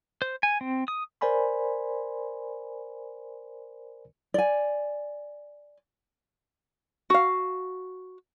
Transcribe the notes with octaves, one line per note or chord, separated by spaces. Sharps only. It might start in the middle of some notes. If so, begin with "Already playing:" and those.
C5
G#5
C4
D#6
A#4 C5 D5 G#5 B5 C6
D5 G#5
F#4 F5